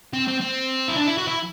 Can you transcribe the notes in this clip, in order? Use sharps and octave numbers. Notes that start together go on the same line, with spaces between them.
C4
C4
C4
E4
D4
E4
F#4
E4